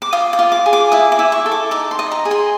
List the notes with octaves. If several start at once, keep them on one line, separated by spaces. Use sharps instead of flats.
D6
F4 D#6
D6
F4
D6
G#4
D6
E4 D#6
D6
E4
C#6
A4
D6
D#4 D6
C6
D#5
A#5
G#4
C6